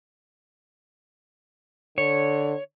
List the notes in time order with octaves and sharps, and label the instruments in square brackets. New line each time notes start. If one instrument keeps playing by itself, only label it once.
[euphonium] D3 [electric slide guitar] C#5